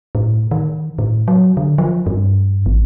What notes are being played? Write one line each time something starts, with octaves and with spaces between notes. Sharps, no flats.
A2
D#3
A2
F#3
D3
F3
G2
A1